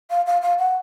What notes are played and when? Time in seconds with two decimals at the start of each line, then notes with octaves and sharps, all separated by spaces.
0.10 F5
0.27 F5
0.42 F5
0.59 F#5